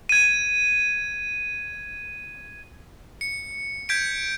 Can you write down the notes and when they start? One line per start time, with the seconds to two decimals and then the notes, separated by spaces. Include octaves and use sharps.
0.09 G#6 D#7
3.21 C#7
3.89 G6 G#6 B6 D7